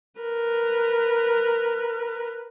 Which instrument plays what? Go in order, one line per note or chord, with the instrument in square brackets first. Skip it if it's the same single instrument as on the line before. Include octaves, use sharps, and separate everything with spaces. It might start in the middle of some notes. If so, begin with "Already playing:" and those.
[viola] A#4 B4